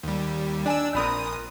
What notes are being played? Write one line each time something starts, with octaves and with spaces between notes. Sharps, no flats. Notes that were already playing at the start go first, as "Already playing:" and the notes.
D#2 G3
D4 D5 G#5 E6
A#1 B3 C4 A#4 D#6